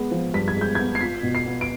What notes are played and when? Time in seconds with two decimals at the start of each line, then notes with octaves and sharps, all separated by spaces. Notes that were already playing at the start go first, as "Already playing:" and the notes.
Already playing: G#3 B3
0.11 F3
0.34 G2 B6
0.48 G#6
0.56 G#3 G6
0.75 B3 G#6
0.95 C7
1.01 F4 B6
1.23 B2
1.35 C7
1.46 B3
1.61 D7